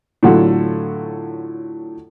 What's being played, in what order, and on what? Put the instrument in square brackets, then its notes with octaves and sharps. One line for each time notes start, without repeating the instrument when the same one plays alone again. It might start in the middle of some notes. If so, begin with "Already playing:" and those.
[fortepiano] A2 D3 F#3 F4 A4 F#5